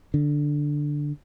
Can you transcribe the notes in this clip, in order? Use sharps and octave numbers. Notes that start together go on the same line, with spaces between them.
D3